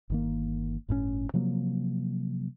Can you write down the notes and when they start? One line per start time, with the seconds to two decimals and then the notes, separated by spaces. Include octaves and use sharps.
0.10 G1 D#3 A#3
0.89 G1 A2 D3 C#4
1.34 C3 F3 F#3 A#3